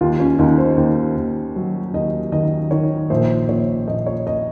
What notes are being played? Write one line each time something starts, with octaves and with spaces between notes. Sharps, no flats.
D#2 F4
C#4
D#2 D#4
C5
D#2
D#2
F#3
D#2 D#5
D#3 D#5
D#3 C#5
A#1 C5
A#1 C#5
A#1 D#5
C#5
D#5